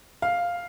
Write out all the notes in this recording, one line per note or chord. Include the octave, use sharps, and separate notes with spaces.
F5